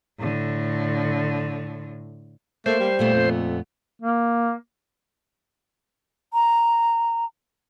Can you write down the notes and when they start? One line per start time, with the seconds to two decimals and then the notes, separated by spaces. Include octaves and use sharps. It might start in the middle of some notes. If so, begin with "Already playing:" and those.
0.19 A2 D3
2.66 A3 A#3 C5
2.79 G3
2.99 A#2 A3 B3
3.14 F2
4.02 A#3
6.34 A#5